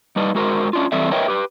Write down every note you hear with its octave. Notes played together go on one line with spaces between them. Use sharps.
G3 D#4 B4 D5 D#5
G#3 F#4 A#4 C5
C#4 D4 F4
E3 G3 C4 A4 D5 E5
A#4 B4 C#5 D#5 E5 G5
G4 B4